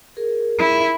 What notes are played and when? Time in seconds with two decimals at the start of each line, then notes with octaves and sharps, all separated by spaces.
0.17 G#4 A#4
0.59 E4